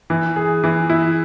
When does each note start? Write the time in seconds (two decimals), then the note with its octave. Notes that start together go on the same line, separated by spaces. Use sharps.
0.10 E3
0.36 G#4
0.64 E3
0.90 E4